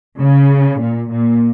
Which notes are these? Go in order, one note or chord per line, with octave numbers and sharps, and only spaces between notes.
C#3
A#2
A#2